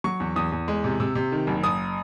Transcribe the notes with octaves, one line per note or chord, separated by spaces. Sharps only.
F#3 C#6
E2
E2 D#6
E2
G#3
C3
C3 E6
C3
D#3
F#1
F#1 D#6